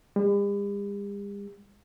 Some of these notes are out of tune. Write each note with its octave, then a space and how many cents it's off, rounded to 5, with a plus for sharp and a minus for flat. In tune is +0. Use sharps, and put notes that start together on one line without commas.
G3 +45